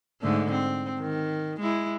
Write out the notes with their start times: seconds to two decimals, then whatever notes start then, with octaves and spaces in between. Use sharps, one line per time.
0.21 G#2 D3 A3
0.51 C4
0.99 D#3
1.60 G#3 E4